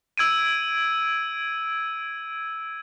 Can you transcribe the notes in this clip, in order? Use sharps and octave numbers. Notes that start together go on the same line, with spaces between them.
E6 G#6 D7 D#7